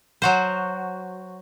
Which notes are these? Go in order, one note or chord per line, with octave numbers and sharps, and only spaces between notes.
F#3 F#4 C5